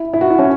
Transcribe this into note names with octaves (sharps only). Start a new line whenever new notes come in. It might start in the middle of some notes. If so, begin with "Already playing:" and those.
Already playing: E4
E4
F#4
E4
C#4